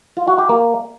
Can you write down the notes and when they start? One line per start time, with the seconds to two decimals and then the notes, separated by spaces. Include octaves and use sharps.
0.17 F4
0.28 F#4
0.38 G4
0.49 A#3